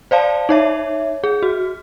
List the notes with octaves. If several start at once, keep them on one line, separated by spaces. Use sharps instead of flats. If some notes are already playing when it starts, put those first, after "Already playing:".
C5 D5 F5 A5
D#4 C#5 E5
G#4
F#4